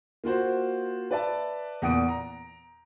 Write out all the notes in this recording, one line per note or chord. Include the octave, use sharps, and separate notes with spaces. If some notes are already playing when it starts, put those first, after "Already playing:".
A#3 F4 F#4 C5
B4 D5 E5 A5
E2 A#2 F#5 D#6 D7
A#5